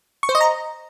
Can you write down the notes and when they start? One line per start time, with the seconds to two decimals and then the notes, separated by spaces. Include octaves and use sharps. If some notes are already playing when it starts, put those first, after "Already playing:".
0.23 C#6
0.29 C5
0.35 D#5
0.41 A#5